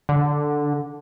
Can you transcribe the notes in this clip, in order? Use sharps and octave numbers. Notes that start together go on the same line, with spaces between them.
D3